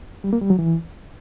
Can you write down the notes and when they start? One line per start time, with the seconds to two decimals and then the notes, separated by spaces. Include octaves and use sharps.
0.24 G3
0.33 A#3
0.41 G3
0.50 F#3
0.59 E3